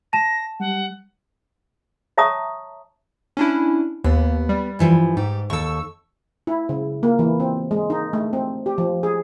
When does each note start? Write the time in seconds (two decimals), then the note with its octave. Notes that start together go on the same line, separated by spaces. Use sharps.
0.13 A5 A#6 E7
0.60 G3 F#5
2.18 C#5 E5 A5 A#5 C#6 D#6
3.37 C#4 D4 E4
4.04 D#2 B3
4.49 G3
4.79 G2 E3 F3
5.17 G#2 G4
5.50 D#2 A4 C#6 E6
6.47 E4
6.69 C#3
7.03 A#3
7.19 E3
7.40 C4
7.71 G#3
7.90 D#4
8.13 A3
8.33 C4
8.66 G4
8.78 F3
9.03 G#4